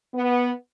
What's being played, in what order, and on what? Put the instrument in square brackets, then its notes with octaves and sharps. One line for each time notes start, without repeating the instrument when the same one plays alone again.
[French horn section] B3